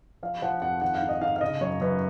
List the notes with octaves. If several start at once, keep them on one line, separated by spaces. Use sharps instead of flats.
F3 F5
F3 F#5
F2 F#5
D#3 F#5
F5
G#2
D#5
G#2 F5
F5
C#3 D#5
F#2 C#5
F#2 B4